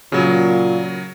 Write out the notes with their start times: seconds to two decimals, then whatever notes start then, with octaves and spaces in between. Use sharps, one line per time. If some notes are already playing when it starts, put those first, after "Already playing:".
0.12 A#2 C#3 F#3